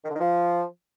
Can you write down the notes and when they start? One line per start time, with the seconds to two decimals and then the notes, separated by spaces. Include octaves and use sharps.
0.04 D#3
0.09 D3
0.15 D#3
0.20 F3